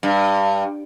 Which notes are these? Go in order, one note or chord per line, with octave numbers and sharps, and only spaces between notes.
G2